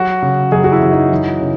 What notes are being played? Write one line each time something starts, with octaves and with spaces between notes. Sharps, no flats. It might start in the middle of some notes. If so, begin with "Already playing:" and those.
Already playing: F#3 F#4
C#3
F#2 G#4
F#4
E4
F#2
D#4
E3
C#3